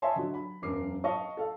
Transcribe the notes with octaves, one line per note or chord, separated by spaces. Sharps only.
C#5 D#5 E5 G#5 A5 C6
D3 F#3
B5
E1 F#2 A#4 D6 C7
D#5 F5 A5 C#6
A4 F5